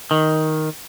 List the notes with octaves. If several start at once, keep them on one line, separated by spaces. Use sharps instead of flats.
D#3